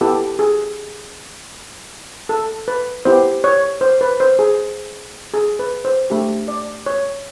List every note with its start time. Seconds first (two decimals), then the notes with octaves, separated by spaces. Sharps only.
0.01 B3 E4 G4 A4
0.39 G#4
2.29 A4
2.68 B4
3.05 B3 E4 G4 C5
3.44 C#5
3.81 C5
4.01 B4
4.20 C5
4.39 G#4
5.34 G#4
5.59 B4
5.85 C5
6.10 A3 D4 G4
6.48 D5
6.86 C#5